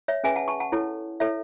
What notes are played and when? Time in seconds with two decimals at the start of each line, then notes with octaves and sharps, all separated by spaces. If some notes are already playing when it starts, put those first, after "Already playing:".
0.08 C#5 E5
0.24 C#4 G#4 B4 E5 G#5
0.36 F#5 A5
0.48 A5 C#6
0.60 F#5 A5
0.72 E4 A4 C#5
1.20 E4 A4 C#5 E5